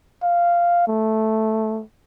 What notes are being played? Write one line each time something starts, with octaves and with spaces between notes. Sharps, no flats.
F5
A3